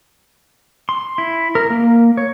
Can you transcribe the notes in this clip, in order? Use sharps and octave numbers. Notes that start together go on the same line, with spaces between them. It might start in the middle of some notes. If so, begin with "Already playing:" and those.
C6
E4
A#4
A#3
C#5